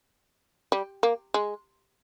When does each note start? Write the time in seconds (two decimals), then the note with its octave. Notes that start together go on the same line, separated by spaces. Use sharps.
0.72 G3
1.03 A#3
1.34 G#3